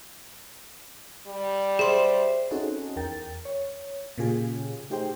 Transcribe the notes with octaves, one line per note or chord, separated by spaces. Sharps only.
G3
G#4 C5 E5 C6
C4 C#4 D#4 F#4 G#4 A4
E2 A#4 G5 A6
C#5
A#2 C#3 C#4 F4 G4 G#4
A3 D#4 G4 G#4 C5 G5